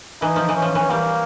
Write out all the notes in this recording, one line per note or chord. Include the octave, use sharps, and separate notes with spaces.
E3 D#4
F3
E3
C#4
F3
E3
G3 A#3